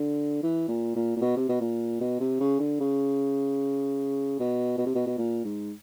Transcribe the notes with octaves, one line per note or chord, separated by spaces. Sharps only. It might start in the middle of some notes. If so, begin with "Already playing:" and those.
Already playing: D3
E3
A#2
A#2
A#2
B2
C3
B2
A#2
B2
C3
C#3
D3
C#3
B2
B2
C3
B2
B2
A#2
G#2